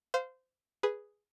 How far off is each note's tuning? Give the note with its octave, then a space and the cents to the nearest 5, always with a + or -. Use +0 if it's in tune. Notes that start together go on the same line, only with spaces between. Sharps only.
C5 -20 F5 +5
G#4 +0 B4 +0